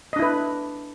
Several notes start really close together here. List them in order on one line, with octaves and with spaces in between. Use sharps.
D#5 D4 E4 B4